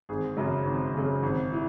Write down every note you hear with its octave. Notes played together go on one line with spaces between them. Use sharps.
G#1 G#4
F#2 C#3 F#3
G#1
F#2 C#3 F#3
G#1
E3